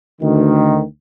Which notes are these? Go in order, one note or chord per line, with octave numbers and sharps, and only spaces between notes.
D2 D#3